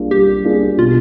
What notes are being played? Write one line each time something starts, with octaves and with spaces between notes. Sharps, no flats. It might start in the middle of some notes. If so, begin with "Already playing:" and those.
Already playing: G3 A#3 D4 F4 G#4
G3 G4
A#3 D4 F4 G#4
B2 F4